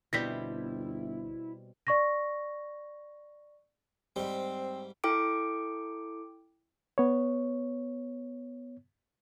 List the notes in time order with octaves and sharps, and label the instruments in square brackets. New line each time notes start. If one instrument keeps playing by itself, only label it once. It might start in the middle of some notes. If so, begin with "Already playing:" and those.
[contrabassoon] G1 [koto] B2 G3 C4 [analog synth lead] E4 [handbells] A#6 B6
[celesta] D5 C#6 A#6
[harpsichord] G#2 G3 [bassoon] C4
[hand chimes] E4 A4 G5 D6 D7
[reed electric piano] B3 C#5